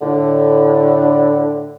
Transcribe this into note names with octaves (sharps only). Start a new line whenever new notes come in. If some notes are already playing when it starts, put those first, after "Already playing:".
A2 D3